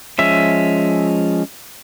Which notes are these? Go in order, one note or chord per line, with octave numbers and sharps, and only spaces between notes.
F3 G#3 C#4 E5